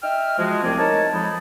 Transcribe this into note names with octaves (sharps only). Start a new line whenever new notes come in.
D#5 E5 G5 F6
F3 G#3 F#4
C2 A3 C4 D5 G#5 A5
D#4 A#4 C#5 A5
F2 F3 G#3 D#4 A5 B5